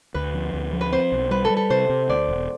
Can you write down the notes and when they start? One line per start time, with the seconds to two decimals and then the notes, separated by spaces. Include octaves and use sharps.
0.14 D2 B4
0.34 F3
0.54 D2
0.73 F3
0.81 B4
0.92 C4 C5
1.12 B1
1.31 G3 B4
1.45 A4
1.50 G3
1.57 A4
1.70 C3 C5
1.89 C3
2.09 D2 D5
2.29 E1